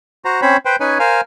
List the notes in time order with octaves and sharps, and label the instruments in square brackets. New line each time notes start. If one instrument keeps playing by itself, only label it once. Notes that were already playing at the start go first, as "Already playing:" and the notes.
[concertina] F#4 C5 A#5
C4 C#4 C5 C#5 B5
B4 C5 G5
C#4 D#4 B4 C#5 G#5
A#4 C5 F5 G#5